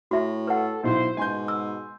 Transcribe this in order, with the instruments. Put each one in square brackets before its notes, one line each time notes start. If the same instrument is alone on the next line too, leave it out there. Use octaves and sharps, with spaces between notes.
[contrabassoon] A2 [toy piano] F#4 E5
[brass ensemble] A4 [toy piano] B4 F#5
[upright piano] B1 E4 [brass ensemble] C5
[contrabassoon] G#2 [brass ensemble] B2 [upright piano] G#5 C6 G6
[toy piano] E6